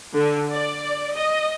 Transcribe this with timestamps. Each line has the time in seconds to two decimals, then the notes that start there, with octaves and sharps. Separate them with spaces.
0.15 D3
0.51 D5
1.14 D#5